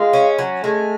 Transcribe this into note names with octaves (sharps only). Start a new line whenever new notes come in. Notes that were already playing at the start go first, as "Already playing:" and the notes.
Already playing: G#3 F4
C#4
F#3
G#3 A3